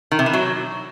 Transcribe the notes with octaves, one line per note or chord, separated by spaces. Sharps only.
D#3
C3
E3
F#3